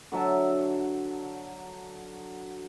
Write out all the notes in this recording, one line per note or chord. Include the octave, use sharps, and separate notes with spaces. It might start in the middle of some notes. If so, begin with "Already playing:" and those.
D3 F#3 E5 A5